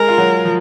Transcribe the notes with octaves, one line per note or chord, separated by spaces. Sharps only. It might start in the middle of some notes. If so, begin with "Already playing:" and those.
Already playing: G#3 G#4 A#4
F4
F#3 F#4
F3